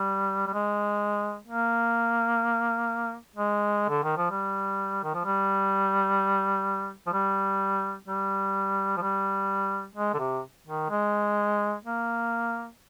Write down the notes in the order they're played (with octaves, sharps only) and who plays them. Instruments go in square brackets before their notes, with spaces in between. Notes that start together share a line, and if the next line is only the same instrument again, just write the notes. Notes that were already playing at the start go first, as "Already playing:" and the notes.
Already playing: [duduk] G3
G3
G#3
A#3
G#3
D3
D#3
F3
G3
D#3
F3
G3
F3
G3
G3
F3
G3
G#3
D3
C3
D#3
G#3
A#3